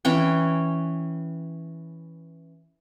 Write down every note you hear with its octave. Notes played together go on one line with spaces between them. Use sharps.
E3 C#4 G5